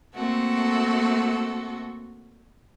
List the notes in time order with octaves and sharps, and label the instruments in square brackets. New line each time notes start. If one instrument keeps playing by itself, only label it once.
[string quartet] A3 A#3 C4 F#4 A4